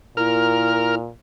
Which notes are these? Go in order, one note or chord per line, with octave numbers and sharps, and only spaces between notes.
A#2 E4 A#4 F6